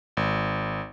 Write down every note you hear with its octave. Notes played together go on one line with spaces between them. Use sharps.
G#1